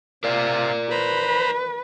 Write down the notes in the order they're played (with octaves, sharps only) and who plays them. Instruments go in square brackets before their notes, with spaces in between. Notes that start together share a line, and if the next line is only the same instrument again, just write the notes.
[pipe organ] C3 F4 [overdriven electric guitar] A#4 D5
[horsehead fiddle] B4 [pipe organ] C5 A#5 B5